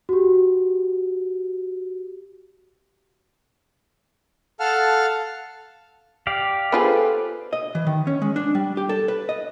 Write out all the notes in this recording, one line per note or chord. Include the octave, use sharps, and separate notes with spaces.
F#4 G4
A4 F5 F#5 A5 F6
G4 D5 F5
B3 F4 G#4 A4 B4 C5
D#5
E3
D#3
C#4
G#3
D4
G3
G4
A4
B4
D#5